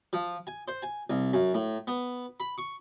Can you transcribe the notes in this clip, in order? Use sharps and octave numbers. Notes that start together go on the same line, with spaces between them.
F3
G#5
C5
G#5
C2
F#2
A2
B3
B5
C#6